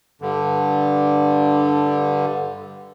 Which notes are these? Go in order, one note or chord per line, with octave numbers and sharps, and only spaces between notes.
G2 D3